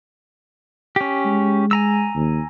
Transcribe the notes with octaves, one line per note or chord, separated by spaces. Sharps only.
C#4 G4
G#3
G#5 A#5 E6
D#2